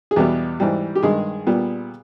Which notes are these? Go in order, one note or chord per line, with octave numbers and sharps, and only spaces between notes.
G#4
E2 B2 G3 B3 G4
G#2 E3 G3
G4
G2 D#3 G#3 G#4
A#2 G3 B3